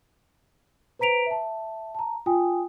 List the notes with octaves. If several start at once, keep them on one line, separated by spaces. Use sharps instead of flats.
B4 C5 A#5 B6 D7 F7
E5 A5
A5 A#5
F4 G5 G#5 D#6